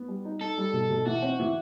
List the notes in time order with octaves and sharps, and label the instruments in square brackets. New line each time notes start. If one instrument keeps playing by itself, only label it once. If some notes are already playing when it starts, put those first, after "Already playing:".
Already playing: [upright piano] B3
G3
D#4
[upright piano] D#4 [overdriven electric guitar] A4
[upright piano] G3
B2
B2
[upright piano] E3 [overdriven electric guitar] F#4
[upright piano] C4
E3